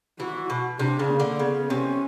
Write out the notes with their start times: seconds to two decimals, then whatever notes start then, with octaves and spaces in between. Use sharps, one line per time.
0.20 E3 F#4
0.50 B2
0.79 C3 D4
0.99 C#3
1.09 A#3
1.20 D3
1.40 C#3 B3
1.69 C3 C#4